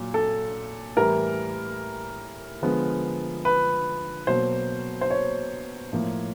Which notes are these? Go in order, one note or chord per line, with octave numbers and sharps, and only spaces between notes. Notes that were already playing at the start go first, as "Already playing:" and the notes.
Already playing: A#2 F#3
A4
A2 E3 G3 A#4
D3 F3 G#3 B3
B4
B2 F#3 A#3 C5
C5
C#5
A2 F3 A#3